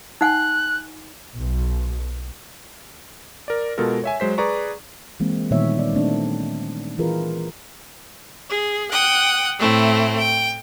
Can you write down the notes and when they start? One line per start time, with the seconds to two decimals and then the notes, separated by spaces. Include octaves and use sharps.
0.21 D#4 F#5 G#5 F#6
1.37 B1
3.48 A#4 D5
3.78 B2 G#3 F4 A4 A#4
4.04 C#5 E5 G#5
4.20 F#3 G#3 C5 B6
4.38 G#4 B4 D5 A#5 C#6
5.20 E3 G#3 A#3 C4
5.51 A#2 D#3 G3 B3 C#5 E5
5.78 B3 D#4 D5
5.93 A3 C4 D4
6.99 E3 E4 F4 G#4 A#4 B4
8.50 G#4
8.91 F#5 G5 D#6
9.60 A2 A3 C4 E4
10.17 G5